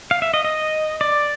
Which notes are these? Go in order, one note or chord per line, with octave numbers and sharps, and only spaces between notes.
F5
E5
D#5
D#5
D5